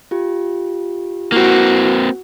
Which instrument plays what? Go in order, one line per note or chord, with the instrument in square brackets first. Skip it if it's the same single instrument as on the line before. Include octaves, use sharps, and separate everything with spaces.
[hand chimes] F4 G4
[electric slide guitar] A#3 C4 [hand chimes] E4 C7 [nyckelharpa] F#4